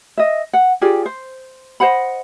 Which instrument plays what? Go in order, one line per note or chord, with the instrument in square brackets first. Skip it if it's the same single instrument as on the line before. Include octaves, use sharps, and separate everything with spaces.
[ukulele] D#5 E5
F#5
F4 G4 G#4 D5
C5
C5 D#5 F#5 B5